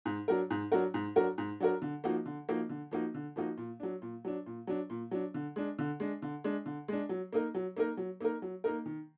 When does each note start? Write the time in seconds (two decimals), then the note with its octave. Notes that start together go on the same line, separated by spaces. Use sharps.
0.05 G#2
0.28 F#3 D4 F#4 A#4
0.50 G#2
0.72 F#3 D4 F#4 A#4
0.94 G#2
1.16 F#3 D4 F#4 A#4
1.38 G#2
1.60 F#3 D4 F#4 A#4
1.82 D3
2.04 F3 A#3 D#4 F#4
2.26 D3
2.48 F3 A#3 D#4 F#4
2.69 D3
2.91 F3 A#3 D#4 F#4
3.14 D3
3.36 F3 A#3 D#4 F#4
3.57 A#2
3.80 F#3 D4
4.02 A#2
4.25 F#3 D4
4.46 A#2
4.67 F#3 D4
4.90 A#2
5.11 F#3 D4
5.34 D3
5.56 G#3 D4
5.79 D3
6.00 G#3 D4
6.22 D3
6.44 G#3 D4
6.66 D3
6.88 G#3 D4
7.09 F#3
7.33 A#3 D#4 A#4
7.55 F#3
7.77 A#3 D#4 A#4
7.97 F#3
8.21 A#3 D#4 A#4
8.42 F#3
8.64 A#3 D#4 A#4
8.86 D#3